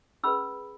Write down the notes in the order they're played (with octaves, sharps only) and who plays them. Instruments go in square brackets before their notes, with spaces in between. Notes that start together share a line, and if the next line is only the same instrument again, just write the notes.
[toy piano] C#4 G#4 B4 B5 E6